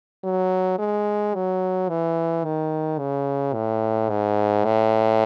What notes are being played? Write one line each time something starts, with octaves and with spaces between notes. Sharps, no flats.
F#3
G#3
F#3
E3
D#3
C#3
A2
G#2
A2